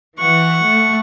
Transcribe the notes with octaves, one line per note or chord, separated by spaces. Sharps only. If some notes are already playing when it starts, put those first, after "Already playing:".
E3 F#5 C#6
A3